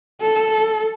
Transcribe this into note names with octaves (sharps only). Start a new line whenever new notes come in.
A4